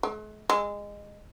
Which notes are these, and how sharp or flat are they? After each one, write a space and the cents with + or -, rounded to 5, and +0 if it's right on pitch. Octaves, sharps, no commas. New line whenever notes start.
G#3 +45
G#3 -20